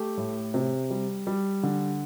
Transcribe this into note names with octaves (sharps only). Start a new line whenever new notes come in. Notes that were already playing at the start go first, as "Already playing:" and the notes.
Already playing: A3 G4
A2
C3
G3
G3
D3